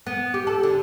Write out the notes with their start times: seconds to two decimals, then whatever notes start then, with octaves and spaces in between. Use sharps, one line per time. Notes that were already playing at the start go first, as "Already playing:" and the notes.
0.07 B3
0.34 G4
0.47 A4
0.63 D3